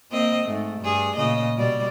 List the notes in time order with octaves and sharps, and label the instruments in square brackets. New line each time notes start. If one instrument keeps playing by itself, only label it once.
[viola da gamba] A#3 C4 D#5
G#2 A3
G2 G#4
A#2 C#3 D#5
B2 G3 D5